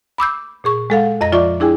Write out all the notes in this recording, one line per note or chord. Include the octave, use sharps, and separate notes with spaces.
B5 D6 E6 G6
A#2 G#4 C#6
G#3 A4 F5 F#5
F2 D#5 A#5 A#6
F3 F4 D5 E5 C#6 D6
D4 E4 G#4 G5 G#5